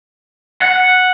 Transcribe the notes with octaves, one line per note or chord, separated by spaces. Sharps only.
F#5